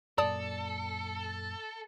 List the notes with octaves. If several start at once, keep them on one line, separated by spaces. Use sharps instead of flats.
F#2 A#2 A4 D5 A5 D#6